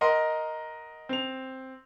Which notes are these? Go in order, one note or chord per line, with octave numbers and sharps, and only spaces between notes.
A#4 D#5 F#5 C6
C4 F7